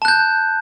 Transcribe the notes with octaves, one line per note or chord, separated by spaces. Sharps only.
A5 F#6 G6